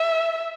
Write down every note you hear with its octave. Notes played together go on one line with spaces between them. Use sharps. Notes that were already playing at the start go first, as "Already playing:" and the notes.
Already playing: E5